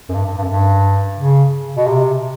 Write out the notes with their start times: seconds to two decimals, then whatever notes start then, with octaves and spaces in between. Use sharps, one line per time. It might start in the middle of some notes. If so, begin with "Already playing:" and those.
0.09 F#2
0.14 G2
0.26 G2
0.37 G2
0.43 F#2
0.48 G2
1.18 C#3
1.77 B2
1.87 C3